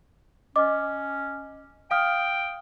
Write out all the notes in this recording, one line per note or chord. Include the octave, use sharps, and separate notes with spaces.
C#4 D#5 D6
F5 G5 D#6 F6